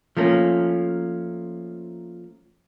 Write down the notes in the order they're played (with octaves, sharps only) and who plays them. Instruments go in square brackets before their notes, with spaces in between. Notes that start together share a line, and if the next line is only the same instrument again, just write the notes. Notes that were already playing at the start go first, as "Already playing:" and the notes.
[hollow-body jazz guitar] F3 A3 A#3 C#4